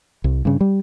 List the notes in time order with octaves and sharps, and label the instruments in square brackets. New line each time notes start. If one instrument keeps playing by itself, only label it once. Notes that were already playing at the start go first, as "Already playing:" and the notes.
[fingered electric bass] C2
G2 C#3
G3